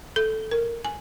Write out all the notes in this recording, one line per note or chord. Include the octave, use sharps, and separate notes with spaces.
A4
A#4
G#5